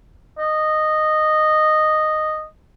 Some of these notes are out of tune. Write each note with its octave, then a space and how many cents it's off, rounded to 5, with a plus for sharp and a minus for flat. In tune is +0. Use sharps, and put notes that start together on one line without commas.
D#5 -10